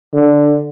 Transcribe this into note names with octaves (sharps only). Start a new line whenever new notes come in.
D3